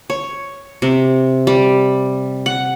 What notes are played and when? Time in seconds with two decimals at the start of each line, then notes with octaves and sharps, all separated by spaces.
0.10 C#5
0.82 C3
1.47 G3
2.46 F#5